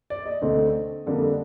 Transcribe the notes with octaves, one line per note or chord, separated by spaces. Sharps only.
D5
D#5
D2 D3 A3 C4
F2 D3 G3 A#3 D4